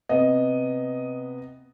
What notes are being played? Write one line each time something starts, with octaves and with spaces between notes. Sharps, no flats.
C3 B3 D#5